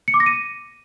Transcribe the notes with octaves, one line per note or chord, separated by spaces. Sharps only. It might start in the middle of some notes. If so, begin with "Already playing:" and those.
C#7
D6
A#6
D#7